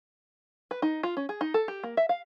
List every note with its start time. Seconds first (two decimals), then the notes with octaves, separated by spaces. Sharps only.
0.71 B4
0.82 D#4
1.03 F4
1.17 C#4
1.29 G#4
1.41 D#4
1.54 A4
1.68 G4
1.83 A#3
1.97 E5
2.09 F5